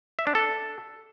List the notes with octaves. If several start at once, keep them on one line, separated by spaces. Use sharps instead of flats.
E5
D4
A4